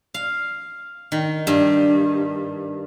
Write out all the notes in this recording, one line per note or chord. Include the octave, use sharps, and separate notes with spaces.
F5
D#3
G2